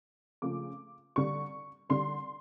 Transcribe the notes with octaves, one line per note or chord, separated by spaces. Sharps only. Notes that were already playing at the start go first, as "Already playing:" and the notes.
C#3 F3 A3 D6
D3 G3 C#6
D3 G3 C6